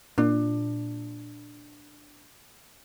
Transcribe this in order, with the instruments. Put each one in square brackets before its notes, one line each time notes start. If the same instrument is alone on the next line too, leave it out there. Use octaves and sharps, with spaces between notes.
[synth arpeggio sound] A#2 [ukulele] D4